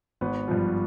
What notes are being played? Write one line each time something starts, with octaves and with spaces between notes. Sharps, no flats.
G#1 B3
G2 F3